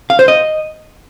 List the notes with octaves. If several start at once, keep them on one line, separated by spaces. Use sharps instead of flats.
F5
C5
D#5